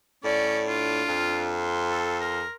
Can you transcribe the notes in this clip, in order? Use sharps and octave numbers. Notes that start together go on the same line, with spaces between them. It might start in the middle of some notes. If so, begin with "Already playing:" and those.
A2 C#4 D5
D4 F4 D6
F2
C6
A4
A#4